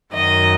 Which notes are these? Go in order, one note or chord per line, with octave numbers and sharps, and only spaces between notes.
F#2 D#3 F#3 D#5